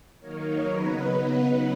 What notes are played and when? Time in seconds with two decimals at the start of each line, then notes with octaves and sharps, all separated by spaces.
0.20 D#3 F#3 A#3 D#4 A#4 C#5
0.64 C#3 F#3 B3 D#4 B4